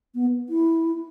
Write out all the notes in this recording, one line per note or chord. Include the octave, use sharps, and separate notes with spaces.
B3
E4